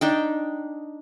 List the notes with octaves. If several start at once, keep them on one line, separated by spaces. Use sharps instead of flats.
D4 D#4 G5